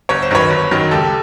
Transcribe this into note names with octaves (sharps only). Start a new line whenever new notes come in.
G1 C#5
C5
F#2 D#3 F#3 B4 C#5
G1
F#2 D#3 F#3
C#2 G4 A4